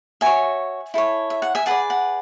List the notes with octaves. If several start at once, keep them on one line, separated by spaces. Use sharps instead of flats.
F#4 C#5 E5 G#5
E4 A4 C#5
E5
F#5
E5 G#5
G#4 B4 D5 F#5 A5
F#5